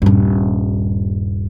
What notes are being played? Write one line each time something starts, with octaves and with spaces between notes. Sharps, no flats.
D#1 G2